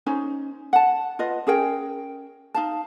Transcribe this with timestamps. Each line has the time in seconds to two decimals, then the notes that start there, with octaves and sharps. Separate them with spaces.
0.06 C#4 D#4 C5
0.73 F#5 A5
1.19 F4 B4 D#5
1.47 C#4 G#4 A#4 G5
2.54 D#4 F5 A5